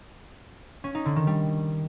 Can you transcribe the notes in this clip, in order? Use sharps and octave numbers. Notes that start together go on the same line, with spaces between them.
C#4
D#4
D3
D#3
G3